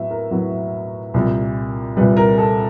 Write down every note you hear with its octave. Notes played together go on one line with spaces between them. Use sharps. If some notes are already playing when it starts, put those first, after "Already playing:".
Already playing: A2 F#3 B3 E5
A#4
A2 F#3 B3
C2 A#2 G3
C2 A#2 G3 B4
A#4
A4